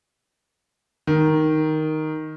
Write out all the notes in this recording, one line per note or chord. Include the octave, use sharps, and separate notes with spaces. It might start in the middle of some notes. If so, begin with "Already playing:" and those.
D#3